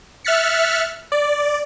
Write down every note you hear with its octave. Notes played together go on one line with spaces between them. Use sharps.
E5 F6 F#6 A6 B6 C#7
D5